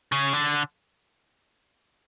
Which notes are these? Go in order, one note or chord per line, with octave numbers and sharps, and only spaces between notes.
C#3
D3